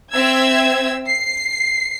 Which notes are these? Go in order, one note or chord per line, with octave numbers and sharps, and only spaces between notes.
C4 E5 E6 G#6
C7